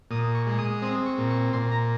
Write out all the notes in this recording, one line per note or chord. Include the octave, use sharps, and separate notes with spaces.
A#2 D#6
C#6
G#3
D#6
C4 D#6
C#6
A#2
C#6
A#2 C6
A#5